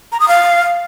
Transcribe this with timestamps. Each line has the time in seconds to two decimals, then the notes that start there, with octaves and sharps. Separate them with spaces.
0.12 A#5
0.20 D#6
0.28 F5